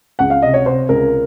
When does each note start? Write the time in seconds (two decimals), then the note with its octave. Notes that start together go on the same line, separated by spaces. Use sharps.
0.19 C#2 F#5
0.30 F5
0.42 C3 D#5
0.54 C#5
0.65 C3 C5
0.89 C#2 A#4